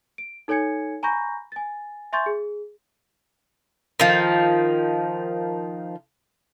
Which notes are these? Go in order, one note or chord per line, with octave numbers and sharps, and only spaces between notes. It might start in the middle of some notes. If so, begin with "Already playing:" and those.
D7
D#4 A4 C#5 G#5 G#6 C#7
G#5 A#5 B5 C#6 G6 A#6
G#5 A6
E5 G#5 C6 C#6 G6 A6
G#4
D#3 F3